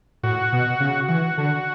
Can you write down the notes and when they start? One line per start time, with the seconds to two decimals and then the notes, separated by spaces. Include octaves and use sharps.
0.23 A2 F#4
0.53 B2
0.80 C#3
1.08 E3 F#4
1.38 D3